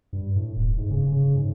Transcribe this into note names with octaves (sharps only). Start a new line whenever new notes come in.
G2
A2
D#1
G#2
C#3
C#3
G#2